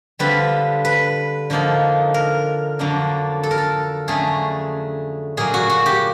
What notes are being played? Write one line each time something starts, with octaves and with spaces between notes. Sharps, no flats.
D3 G3 C4 F4 B4
B4
D3 F3 A#3 D#4
A#4
F2 D3 F#3 A#3 D4
A4
A#4
A4
F2 D3 F#3 A3 C#4 G#4
A#2 F#3 A#3 G#4
F#4
F#4
G4